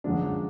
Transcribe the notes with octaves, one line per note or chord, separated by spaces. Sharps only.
F#2 D3 F3 G#3 D4